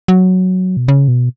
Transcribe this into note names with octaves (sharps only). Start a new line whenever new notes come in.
F#3
B2
C#3
B2